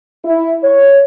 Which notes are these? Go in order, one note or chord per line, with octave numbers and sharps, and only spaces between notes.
E4
C#5